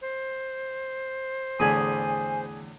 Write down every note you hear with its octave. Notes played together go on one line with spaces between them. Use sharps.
C5
E2 A2 D3 G#4 G#5 B5 D#6